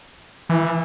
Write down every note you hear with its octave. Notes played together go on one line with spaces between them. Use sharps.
E3